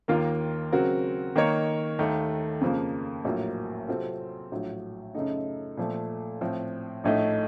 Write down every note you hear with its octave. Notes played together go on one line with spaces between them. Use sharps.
D#2 D#3 A#3 F4 A#4
C#3 F#3 C4 F#4 A#4
D#3 A#3 D#4 A#4 C#5
D#2 D#3 A3
F2 C#3 F3 A#3
A#1 A2 F#3 A#3
C3 F#3 C4 F4 A4
A#1 A2 F#3
F#2 C#3 A3 D#4
A#2 F3 A3
A2 F3 C4
A#1 A2 A3 D#4